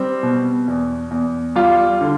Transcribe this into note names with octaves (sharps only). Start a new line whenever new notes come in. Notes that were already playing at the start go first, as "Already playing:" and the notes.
Already playing: G3 C4
B2
E2
E2
G3 F4
D3